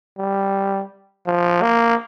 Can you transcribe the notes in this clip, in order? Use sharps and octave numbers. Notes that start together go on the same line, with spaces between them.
G3
F3
A#3